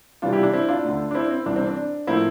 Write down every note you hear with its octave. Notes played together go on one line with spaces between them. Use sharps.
E2 C3 E3 G3 D4 F4
E4 G4
D4
C4 E4
D4 F4
D2 D3 A3
D4
C4 E4
C4
C2 C3 E3 D4
C4
D4
A2 F3 A#3 C4 E4